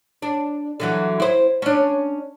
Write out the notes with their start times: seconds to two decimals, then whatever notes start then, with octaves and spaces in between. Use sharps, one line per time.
0.22 D4
0.80 D3 E3 F#3
1.20 E4 C5
1.62 C#4 D4